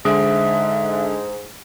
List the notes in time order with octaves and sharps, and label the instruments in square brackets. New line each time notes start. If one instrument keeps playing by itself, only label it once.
[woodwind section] G#2 [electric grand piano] D3 G#3 [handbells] G#4 [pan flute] E5